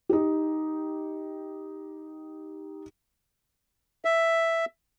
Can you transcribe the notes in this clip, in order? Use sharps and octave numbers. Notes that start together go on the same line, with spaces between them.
D#4 G4
E5